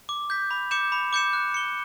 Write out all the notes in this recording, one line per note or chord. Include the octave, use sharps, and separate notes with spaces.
D6
G6 B6
B5
D6 G6 C#7 E7
B5
D6 G6 C#7 E7
F#6
C#7 G7